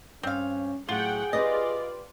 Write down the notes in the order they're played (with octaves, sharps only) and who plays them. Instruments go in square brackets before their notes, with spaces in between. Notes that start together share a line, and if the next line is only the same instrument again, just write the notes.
[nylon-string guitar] G2 [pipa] C4 F5 [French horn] C#4
[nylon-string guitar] A2 F#3 [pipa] F4 [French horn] G#4 [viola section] F#5 G5
[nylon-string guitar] C4 G4 B4 [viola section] F4 D5 [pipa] D#5